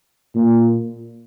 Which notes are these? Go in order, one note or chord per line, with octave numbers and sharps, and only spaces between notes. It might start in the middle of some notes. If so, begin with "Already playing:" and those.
A#2